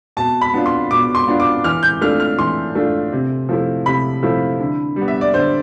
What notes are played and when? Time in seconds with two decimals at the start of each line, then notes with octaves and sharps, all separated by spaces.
0.17 B2 A5
0.41 B5
0.54 B3 D4 F4
0.66 C6
0.90 B2 D6
1.15 C6
1.28 B3 D4 F4
1.40 D6
1.64 E3 F6
1.83 G6
2.01 A3 D4 F4 F6
2.20 F6
2.38 E3 C6
2.75 A3 D4 F4
3.13 C3
3.49 F3 A3 E4
3.86 C3 B5
4.23 F3 A3 E4
4.60 D3
4.96 G3
5.01 B3
5.08 E5
5.21 D5
5.34 D3 C5